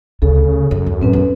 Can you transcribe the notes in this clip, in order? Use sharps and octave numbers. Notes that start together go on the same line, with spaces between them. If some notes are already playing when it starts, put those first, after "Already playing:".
D2 C#3 A4
F#2 C#3
D#2
A2 C4 C#4 B4
B3 E4